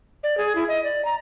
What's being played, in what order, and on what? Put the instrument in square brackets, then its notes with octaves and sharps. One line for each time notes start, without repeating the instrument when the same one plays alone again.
[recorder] D5
G#4
E4
D#5
D5
A#5